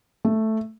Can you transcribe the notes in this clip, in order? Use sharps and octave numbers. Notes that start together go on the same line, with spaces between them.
A3